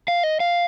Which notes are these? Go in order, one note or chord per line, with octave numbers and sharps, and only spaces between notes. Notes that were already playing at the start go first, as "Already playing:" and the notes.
F5
D#5
F5